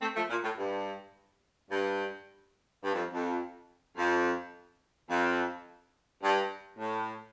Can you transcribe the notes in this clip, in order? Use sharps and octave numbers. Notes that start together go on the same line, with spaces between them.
A3 C4
F3 A3
A#2
A2
G2
G2
G2
F2
F2
F2
F2
G2
A2